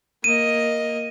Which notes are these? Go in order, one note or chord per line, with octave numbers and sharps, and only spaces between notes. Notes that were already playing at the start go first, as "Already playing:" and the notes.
A#3 D#5 D#7